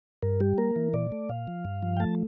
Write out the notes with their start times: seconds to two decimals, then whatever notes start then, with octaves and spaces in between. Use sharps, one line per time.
0.23 G2 A#4
0.40 G3 G4
0.58 A#3 A#4
0.76 E3
0.93 A#2 D5
1.12 A3
1.29 A#2 F5
1.47 F3
1.65 G2
1.83 F3
1.97 G5
2.00 A3 A5